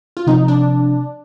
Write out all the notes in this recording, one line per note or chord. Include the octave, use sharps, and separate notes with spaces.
F4
C3 F3 C4 D#4
D4